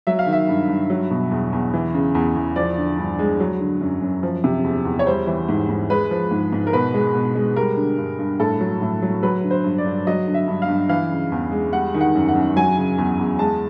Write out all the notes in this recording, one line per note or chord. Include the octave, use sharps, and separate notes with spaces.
F#3 E5
F5
D#3
E5
G2
G2
F#3
B2
E2
E2
E3
C#3
E2
E2
F3 D5
D3
G2
G#3
F#3
D3
F#2
F#2
F3
C3
E2
E2
C#5
G3 C5
E3
G#2
G#2
G#3 B4
F3
G#2
G#2
A#4
B2 B4
G#3
B2
G#3
G3 A#4
D3
G2
G2
A2 A4
F#3
A2
F#3
F#3 B4
D3
C5
G2
D5
G2
F#3 D#5
D3
E5
G2
F5
G2
E3 F5
C#3
E2
G#3
G3 F#5
D#3
F#5
F#2
F#5
F#2
F#3 G#5
C#3
E2
E2
G#3 A5